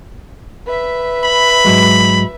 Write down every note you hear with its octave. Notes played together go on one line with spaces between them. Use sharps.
B4 E5
B5
G#2 F#3 G#3